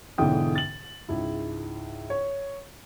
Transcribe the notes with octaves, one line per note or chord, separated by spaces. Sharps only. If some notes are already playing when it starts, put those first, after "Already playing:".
B1 G#2 D3 E3 G5 D#6
A6 F#7
C#2 G#2 E4
C#5